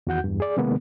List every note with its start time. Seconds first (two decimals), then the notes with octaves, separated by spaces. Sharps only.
0.07 E2 D#3 F#4 F#5 G6
0.24 E2 G2
0.40 G#4 D5
0.57 C3 D#3 G#3 A#3 B3